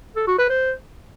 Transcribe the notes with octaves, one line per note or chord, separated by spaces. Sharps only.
A4
F#4
B4
C5